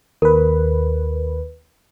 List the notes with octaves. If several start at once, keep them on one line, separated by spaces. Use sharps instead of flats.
D#2 A#4 B4